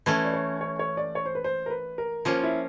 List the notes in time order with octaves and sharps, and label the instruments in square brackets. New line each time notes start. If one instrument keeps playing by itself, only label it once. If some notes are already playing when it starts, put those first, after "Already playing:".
[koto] E3 A3 C#4 [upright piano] B4
[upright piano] D5
C#5
C#5
C#5
D5
C#5
C5
B4
C5
A#4
B4
A#4
[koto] F3 A#3 C#4 [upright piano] F4
[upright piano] E4